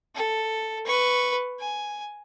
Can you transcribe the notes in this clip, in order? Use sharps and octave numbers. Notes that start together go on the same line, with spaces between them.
A4
B4 C#6
G#5